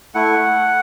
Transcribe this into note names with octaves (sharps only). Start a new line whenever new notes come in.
A3 E4 F#5